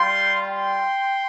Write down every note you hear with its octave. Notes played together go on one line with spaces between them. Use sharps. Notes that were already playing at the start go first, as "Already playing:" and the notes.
Already playing: G3 F4 G5 C6
G5 C6